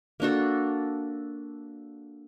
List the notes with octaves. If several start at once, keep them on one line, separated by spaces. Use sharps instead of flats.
A#3 D4 F#4 A4